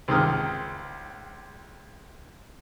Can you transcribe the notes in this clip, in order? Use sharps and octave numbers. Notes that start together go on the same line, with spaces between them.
C#2 C3 D#3 D#6 F6